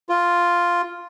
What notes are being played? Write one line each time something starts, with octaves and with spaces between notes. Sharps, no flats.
F4